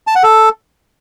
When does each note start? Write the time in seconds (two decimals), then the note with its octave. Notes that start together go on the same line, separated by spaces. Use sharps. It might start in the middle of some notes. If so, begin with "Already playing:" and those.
0.07 A5
0.15 F#5
0.23 A4